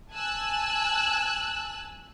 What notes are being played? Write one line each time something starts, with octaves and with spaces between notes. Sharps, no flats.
G#5 A5 E6 F#6